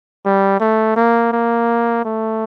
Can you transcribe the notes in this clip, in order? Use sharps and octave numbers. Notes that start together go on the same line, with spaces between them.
G3
A3
A#3
A#3
A3